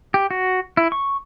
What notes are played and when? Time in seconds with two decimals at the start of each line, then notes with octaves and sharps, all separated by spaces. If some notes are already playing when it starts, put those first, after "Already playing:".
0.14 G4
0.31 F#4
0.77 E4
0.92 C#6